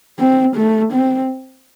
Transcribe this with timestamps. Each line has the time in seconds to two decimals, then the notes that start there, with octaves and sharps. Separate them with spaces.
0.19 C4
0.56 A3
0.93 C4